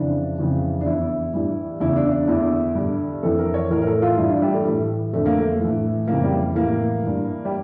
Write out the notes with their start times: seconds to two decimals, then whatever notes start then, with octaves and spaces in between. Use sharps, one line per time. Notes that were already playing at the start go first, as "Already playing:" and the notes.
Already playing: F2 C#3 E3 D4
0.38 F2 C#3 E3
0.81 D4
0.85 E2 E3 E4
1.34 G2 E3
1.80 E2 C#3 E3 E4
1.96 D4
2.11 D4
2.28 E2 D3 E4
2.75 G2 D3
3.23 F2 E3 A4
3.39 A#4
3.54 C#5
3.70 A2 E3 A#4
3.82 A#4
3.87 A4
4.02 F4
4.17 G2 E3 E4
4.30 D4
4.42 G3
4.54 A3
4.65 A2 E3 A3
5.13 F2 D3 A3
5.26 A#3
5.40 A3
5.60 A2 E3
6.08 F2 C#3 E3 A#3
6.24 G3
6.55 A2 E3 A#3
7.03 G2 E3
7.45 G3